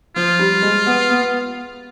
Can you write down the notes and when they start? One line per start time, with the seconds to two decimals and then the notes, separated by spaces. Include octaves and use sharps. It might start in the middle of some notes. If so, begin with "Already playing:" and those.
0.16 F3 F4
0.39 G3
0.62 G#3
0.86 B3
1.10 B3